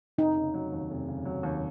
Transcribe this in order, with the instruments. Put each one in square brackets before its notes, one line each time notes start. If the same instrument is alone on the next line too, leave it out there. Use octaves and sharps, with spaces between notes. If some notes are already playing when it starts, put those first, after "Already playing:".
[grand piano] F1 [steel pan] D#4
[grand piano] C#3
F#3
D#2
F1
C#3
F#3
D#2